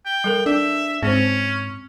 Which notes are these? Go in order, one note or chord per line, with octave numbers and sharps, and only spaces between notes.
G5
G3 A4 A#4
D4 E5
G#2 C4 C#4 C5